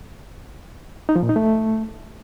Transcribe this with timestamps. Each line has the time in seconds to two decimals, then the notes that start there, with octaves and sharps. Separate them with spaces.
1.09 D#4
1.16 F3
1.22 A#2
1.29 D#4
1.36 A3